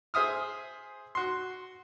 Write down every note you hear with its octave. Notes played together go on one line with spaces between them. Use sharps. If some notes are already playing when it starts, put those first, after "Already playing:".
G#4 C5 E5 D#6 F6
F#4 C6